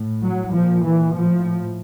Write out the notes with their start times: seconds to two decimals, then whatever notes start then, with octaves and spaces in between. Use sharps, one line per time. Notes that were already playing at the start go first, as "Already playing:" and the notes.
Already playing: A2
0.22 F#3
0.53 A#2 F3
0.84 E3
1.14 A2 F3